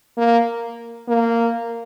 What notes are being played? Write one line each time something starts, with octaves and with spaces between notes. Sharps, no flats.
A#3
A#3